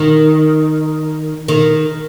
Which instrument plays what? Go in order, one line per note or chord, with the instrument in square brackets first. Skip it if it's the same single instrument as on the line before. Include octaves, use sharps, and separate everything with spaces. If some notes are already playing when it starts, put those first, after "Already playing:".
Already playing: [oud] D#3
D#3